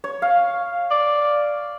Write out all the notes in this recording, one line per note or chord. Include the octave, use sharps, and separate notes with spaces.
C#5
F5
D5